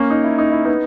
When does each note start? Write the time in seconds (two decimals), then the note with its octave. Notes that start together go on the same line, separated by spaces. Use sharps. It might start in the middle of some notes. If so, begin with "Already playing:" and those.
Already playing: A#3 C#4
0.10 D#4
0.24 E4
0.38 D#4
0.52 E4
0.65 B3 D#4